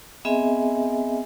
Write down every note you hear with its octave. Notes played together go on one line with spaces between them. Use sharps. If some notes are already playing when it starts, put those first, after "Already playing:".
B3 C4 G#4 D#5 E5 G#5